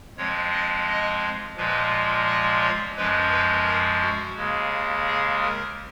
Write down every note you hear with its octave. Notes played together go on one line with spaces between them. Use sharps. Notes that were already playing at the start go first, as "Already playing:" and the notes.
F2 F3 G#3 C#5
D#5
D#5
A#2 F3 G#3 B4
D#5
C#5
F#2 F3 G#3 B4
B4
A#4
F#4
D#2 C#3 G#3
G#4
A#4